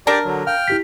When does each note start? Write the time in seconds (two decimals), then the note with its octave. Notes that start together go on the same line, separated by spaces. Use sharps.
0.07 D4 G4 A#4 D5 D6
0.25 D3 F#3
0.47 F5 G5 F6
0.68 E4 G4 B6